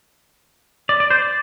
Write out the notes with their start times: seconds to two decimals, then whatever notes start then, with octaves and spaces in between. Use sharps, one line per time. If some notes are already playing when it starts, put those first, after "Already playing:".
0.89 D5
1.00 D5
1.11 C5
1.22 D5